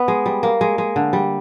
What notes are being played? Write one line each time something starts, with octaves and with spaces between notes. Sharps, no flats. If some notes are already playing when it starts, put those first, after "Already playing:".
Already playing: B3
G#3
G3
A#3
G#3
G#3
D3
G3